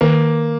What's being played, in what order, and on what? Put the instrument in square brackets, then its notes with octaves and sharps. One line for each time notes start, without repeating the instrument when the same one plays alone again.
[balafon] D#3 [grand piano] A#3